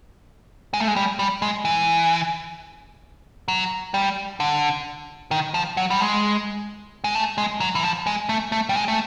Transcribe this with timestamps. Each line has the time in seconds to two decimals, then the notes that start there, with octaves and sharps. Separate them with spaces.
0.74 G#3
0.80 A3
0.88 G#3
0.96 G3
1.19 G3
1.42 G#3
1.65 E3
3.48 F#3
3.94 G3
4.40 D3
5.31 D#3
5.54 F3
5.77 F#3
5.90 G3
6.01 G#3
7.04 G#3
7.15 A3
7.38 G#3
7.60 F#3
7.75 E3
7.83 F3
8.06 G#3
8.29 A3
8.52 A3
8.69 G3
8.75 G#3
8.88 A3